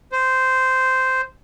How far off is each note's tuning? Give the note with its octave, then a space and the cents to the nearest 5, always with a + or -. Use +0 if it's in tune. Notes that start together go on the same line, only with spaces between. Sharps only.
C5 -10